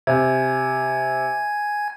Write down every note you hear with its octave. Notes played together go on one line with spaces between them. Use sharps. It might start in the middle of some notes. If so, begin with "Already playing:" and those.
C3 G#5 G#6